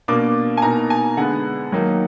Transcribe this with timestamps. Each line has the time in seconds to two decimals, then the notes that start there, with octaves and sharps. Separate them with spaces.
0.08 B2 A#3 D4 D6
0.57 G#5
0.62 B2 A#3 D#4 A#5
0.90 G#5
1.17 D3 G#3 B3 F#5
1.72 D#3 F#3 A#3 D#4